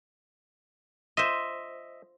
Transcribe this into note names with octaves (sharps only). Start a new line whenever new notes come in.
F4 C5 D#5 E5